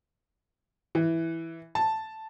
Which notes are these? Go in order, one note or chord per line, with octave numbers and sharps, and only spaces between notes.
E3
A5